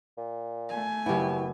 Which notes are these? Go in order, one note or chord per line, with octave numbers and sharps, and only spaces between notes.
A#2
A3 G#5
F#1 B3 C#4 E4 G4